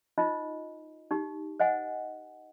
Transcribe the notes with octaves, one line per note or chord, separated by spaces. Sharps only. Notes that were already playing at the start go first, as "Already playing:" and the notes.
D#4 F4 C5 D#5
D#4 G4
C5 D#5 F#5 G#5